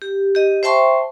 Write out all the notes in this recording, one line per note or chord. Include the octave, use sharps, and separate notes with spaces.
G4
G4 D#5
C5 E5 G5 A5 C6 C#6